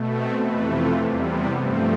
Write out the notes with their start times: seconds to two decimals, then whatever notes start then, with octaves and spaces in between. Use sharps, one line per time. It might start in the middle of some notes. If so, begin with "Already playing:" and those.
Already playing: B2 A3
0.13 C4
0.41 F2 C3 E3 A3 B4
0.71 F4
1.00 E2 C3 G3
1.28 B3
1.58 G2 F3 A3 C4